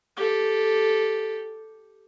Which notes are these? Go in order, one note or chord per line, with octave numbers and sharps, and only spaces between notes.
G4 A4